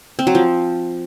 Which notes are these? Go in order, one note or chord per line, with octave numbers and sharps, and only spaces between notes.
C4
F#3
F3